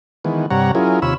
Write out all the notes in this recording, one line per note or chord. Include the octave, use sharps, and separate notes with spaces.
D#3 E3 G#3 B3
G2 C3 G3 C#5 F#5 A#5
F#3 C#4 E4 F4 G#4 A#4
D#2 C3 F4 C#5 B5 E6